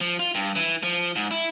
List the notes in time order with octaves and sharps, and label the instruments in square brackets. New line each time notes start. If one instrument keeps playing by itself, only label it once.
[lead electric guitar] F3
F4
G2
E3
F3
G#2
E4